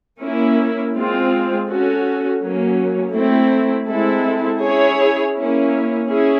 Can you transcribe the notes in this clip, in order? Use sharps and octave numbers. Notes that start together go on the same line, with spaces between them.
A#3 C#4 E4
G#3 C4 F4
C#4 F#4 A4
F#3 A#3 C#4
A3 C4 E4
G#3 C4 E4 A4
C#4 E4 G#4 C#5
A#3 C#4 E4
C#4 E4 G#4